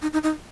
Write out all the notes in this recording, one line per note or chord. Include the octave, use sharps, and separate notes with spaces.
D#4
D#4
D#4